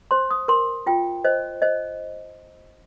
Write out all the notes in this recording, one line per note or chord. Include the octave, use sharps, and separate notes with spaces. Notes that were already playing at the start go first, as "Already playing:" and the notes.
C5 C6
D#6
A#4 C6
F4 G5
C5 D#5
C5 D#5